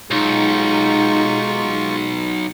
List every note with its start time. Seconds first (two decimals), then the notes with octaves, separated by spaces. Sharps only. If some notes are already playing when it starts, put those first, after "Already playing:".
0.11 B1 G#3 D#4 F4 C#6